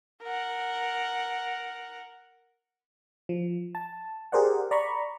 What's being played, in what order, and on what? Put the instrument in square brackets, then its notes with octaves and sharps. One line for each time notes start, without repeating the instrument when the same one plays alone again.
[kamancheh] A#4 F#5
[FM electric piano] F3
A5
G4 G#4 A#4 C5 D5 F#5
D5 A#5 B5 C#6